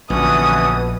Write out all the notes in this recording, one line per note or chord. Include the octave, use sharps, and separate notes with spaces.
A#1 B2 D3 E3 C#4 D#6